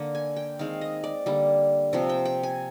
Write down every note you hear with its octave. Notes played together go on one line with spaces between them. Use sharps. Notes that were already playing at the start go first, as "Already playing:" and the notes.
Already playing: D3 A#3
G#5
G5
D#3 G#3 C4 F5
D#5
D5
D3 G3 A#3
C3 F3 C4 C5
G5
G5
G#5